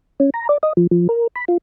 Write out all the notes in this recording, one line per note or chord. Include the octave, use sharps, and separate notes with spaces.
C#4
A#5
D5
D#5
F3
F3
A#4
B5
F4